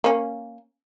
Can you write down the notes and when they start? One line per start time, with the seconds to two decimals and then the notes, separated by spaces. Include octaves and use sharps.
0.04 A#3 C#4